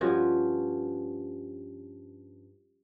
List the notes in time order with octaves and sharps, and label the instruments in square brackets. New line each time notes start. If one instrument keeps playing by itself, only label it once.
[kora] G2 F3 C#4 F#4